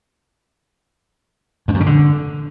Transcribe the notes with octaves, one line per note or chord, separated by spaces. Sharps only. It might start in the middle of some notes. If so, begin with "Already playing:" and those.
F2
F#2
C#3
D3